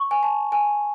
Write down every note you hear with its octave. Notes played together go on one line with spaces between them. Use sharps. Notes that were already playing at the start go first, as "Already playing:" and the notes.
Already playing: C#6
G#5
A5
G#5